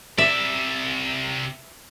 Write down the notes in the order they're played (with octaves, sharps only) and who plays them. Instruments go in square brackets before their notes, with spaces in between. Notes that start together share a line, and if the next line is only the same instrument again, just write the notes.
[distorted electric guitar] C3 D5 [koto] E5